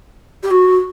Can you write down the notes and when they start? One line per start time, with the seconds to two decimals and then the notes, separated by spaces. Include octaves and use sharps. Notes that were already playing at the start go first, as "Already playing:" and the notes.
0.43 G4
0.50 F#4